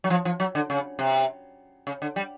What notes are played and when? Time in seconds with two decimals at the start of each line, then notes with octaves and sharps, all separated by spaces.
0.04 F#3
0.10 F3
0.25 F3
0.40 F#3
0.55 D3
0.70 C#3
0.99 C3
1.87 C#3
2.02 D3
2.16 G3